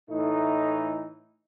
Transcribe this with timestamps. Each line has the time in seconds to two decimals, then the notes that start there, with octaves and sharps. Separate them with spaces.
0.10 A2 E3 A3 D#4